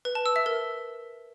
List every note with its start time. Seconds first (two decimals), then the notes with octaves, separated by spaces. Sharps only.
0.05 B4
0.15 A5
0.26 E6
0.36 E5
0.46 A#4